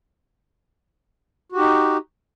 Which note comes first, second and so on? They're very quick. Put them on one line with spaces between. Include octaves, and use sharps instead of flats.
F#4 G4 D#4